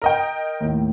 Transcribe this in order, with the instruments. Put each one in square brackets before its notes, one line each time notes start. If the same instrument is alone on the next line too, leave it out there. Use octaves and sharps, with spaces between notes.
[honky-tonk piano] A#4 D#5 G5
[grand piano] D#2 A2